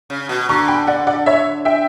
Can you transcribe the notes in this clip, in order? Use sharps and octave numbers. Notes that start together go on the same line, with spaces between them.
C#3
B2
D3 A#5 C#6
G5 B5
D5 F#5
D5 F#5
C#5 E5
E5 G5